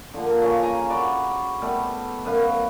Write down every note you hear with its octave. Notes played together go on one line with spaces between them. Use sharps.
D3 F3 A#3
C#3 C#4
G#5 A#5
F#4 D5 B5
G3 A3 B3
F#2 B4 F5